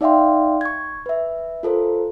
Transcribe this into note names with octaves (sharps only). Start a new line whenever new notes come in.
D#4 D5 E5 F5 G5 C6
C#6 G#6
B4 E5
F4 A4 A#4 C5